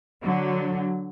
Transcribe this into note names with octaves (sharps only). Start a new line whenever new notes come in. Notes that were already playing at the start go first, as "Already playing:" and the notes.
D3 F#3